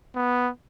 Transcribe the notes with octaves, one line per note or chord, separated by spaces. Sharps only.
B3